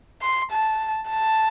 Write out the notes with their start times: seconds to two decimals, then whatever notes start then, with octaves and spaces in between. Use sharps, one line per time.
0.22 C6
0.51 A5
1.10 A5